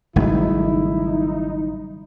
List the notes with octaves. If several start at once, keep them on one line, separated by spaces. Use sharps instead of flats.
G#1 C#3 F#3 G3 A3 D#4 E4